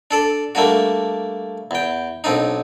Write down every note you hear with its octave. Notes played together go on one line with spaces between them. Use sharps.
D4 A4 D5
G3 A3 A#3 D4 F#4
E2 G5
B1 C4 D4 D#4